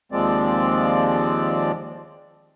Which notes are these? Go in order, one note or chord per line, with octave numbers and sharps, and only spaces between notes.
D#2 F3 G#3 C4 D5